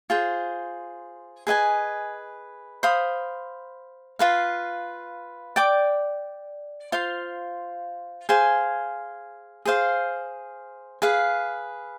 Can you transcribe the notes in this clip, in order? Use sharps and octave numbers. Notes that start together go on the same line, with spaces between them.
F4 G#4 C5
G#4 B4 D#5 G#5
C5 F5 B5 D#6
F4 B4 F5
D5 G5 D6
F4 C5 F5 C6
G#4 C5 F5 G#5
G#4 C5 F5
G#4 B4 F5